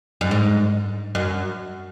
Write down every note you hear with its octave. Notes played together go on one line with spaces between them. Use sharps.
F#2
G#2
F#2